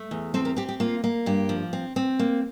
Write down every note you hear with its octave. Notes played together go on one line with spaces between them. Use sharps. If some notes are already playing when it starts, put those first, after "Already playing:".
Already playing: A3
E2
C4 A4 C5
G4 A#4
C4 G4
G4
A#3 F4
A#3
G2 G4
F3
C4
C4
A#3